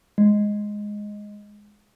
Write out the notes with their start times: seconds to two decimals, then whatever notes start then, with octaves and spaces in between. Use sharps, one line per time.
0.18 G#3